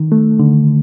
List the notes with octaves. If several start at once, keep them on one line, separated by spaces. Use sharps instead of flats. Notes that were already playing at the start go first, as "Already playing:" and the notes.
Already playing: D#3
A3
D3